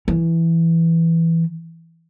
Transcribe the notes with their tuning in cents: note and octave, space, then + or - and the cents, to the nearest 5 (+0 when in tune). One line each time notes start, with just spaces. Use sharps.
E3 +5